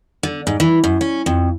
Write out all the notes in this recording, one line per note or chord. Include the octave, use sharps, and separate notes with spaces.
D3
G#2
E3
F#2
C#4
F2